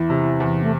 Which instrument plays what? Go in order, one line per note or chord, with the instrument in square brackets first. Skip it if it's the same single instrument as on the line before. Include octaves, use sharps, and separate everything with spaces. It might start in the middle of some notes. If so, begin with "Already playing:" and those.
Already playing: [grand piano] E2 [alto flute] E4
[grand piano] C3
E2
[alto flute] A3